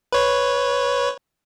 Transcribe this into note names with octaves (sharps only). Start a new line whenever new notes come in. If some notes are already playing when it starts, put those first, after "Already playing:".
B4 C#5